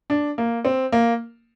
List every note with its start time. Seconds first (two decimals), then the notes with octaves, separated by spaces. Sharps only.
0.10 D4
0.38 A#3
0.65 C4
0.92 A#3